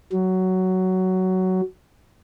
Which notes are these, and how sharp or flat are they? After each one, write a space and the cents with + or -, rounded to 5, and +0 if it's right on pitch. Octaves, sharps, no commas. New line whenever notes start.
F#3 +10